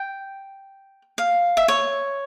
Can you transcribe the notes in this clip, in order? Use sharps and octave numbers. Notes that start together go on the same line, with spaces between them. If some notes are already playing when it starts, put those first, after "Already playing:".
Already playing: G5
F5
E5
C#5